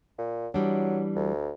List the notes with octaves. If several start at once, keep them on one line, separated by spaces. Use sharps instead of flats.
A#2
E3 F#3 G3 D4
D2